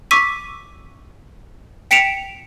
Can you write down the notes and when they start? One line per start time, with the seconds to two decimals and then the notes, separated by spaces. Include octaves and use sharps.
0.11 C#6 D6 E6 B6 D#7
1.91 G5 B6 C#7 D7 E7 F7